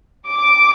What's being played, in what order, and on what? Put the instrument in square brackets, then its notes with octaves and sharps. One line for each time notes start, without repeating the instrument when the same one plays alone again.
[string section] D6